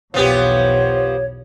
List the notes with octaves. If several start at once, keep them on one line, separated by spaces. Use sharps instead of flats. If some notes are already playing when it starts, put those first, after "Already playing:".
B1 E2 F3 B3 G4 C#5